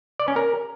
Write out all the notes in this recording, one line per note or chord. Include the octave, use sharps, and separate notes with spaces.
D5
C#4
A#4